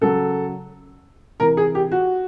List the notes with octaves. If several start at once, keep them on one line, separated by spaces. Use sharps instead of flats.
C#3 F#3 A4
C3 E3 A#4
G#4
G4
F#4